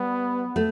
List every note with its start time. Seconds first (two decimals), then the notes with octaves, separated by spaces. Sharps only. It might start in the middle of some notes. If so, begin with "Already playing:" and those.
Already playing: G3 B3
0.56 A3